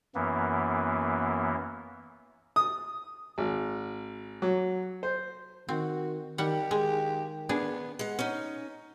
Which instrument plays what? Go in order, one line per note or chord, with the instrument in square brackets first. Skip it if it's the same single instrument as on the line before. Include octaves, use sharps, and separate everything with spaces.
[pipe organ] F#2 E3 A#3 B3
[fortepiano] D#6
G#1
F#3
C5
[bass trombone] D#3 [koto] C4 [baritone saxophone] F#4
[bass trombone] D#3 [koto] G3 F#5 [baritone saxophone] G4
[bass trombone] D#3 [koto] G#3
[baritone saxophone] B3 [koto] D4 G#4
[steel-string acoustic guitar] G#3 F#5
C#4 D#4